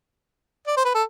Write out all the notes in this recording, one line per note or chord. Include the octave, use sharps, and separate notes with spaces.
D5
C5
B4
A4